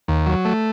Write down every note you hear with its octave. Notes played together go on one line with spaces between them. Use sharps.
D#2
F#3
A3